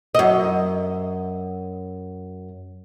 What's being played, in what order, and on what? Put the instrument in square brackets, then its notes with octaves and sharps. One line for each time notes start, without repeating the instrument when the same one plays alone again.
[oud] F#2 D#5